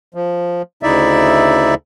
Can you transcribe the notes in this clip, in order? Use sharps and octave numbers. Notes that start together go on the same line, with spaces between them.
F3
D2 C#3 D#4 E4 D5 E5